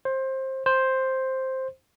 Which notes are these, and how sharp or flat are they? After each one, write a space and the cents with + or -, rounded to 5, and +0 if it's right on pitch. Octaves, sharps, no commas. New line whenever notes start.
C5 +20
C5 +5